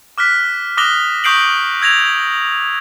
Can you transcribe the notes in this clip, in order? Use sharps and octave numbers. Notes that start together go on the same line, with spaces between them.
D6 F6 F#6 B6
D6 D#6 F#6 A#6 G7
C#6 D#6 G6 C7 D7 F#7
E6 G#6 A#6 F7